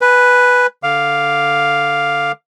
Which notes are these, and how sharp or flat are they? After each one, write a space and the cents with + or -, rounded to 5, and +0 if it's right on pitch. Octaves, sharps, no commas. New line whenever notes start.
B4 +0 G#5 +0
D3 +0 F5 +0 D6 +0